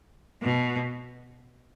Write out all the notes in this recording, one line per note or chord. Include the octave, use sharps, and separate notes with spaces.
B2